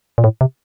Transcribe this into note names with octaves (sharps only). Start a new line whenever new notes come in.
A#2
A2
C3